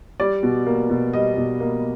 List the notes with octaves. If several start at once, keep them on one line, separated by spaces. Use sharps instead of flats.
G3 D5
B2
A#3
B2
G3 D#5
B2
A#3